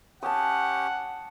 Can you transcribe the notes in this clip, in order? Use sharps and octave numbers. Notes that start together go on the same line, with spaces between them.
C#4 G4 F#5 A5 D#6